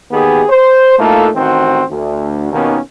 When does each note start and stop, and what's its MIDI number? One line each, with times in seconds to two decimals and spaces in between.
0.12 0.44 39
0.12 0.44 51
0.12 0.44 59
0.12 0.44 67
0.12 0.44 68
0.49 0.98 72
0.99 1.30 45
0.99 1.30 57
0.99 1.30 58
0.99 1.30 63
0.99 1.30 65
0.99 1.30 69
1.36 1.83 33
1.36 1.83 51
1.36 1.83 60
1.36 1.83 66
1.36 1.83 72
1.90 2.49 38
2.52 2.78 39
2.52 2.78 47
2.52 2.78 51
2.52 2.78 58
2.52 2.78 59
2.52 2.78 61